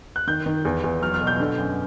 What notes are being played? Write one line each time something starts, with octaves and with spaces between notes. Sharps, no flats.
F#6
D#3 G6
D#3
E2
E2
F#3 F6
F6
B2
G6
D3
F#2